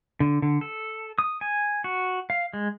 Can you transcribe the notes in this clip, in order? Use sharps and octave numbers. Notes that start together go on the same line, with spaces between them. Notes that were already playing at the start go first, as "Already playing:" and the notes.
D3
D3
A4
D#6
G#5
F#4
F5
G#3